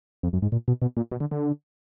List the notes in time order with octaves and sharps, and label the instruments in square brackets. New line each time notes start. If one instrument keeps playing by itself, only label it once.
[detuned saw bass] F2
F#2
G#2
A#2
B2
B2
A#2
B2
D3
D3